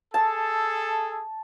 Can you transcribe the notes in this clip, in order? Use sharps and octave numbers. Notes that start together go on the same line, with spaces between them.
G#4 A4 A5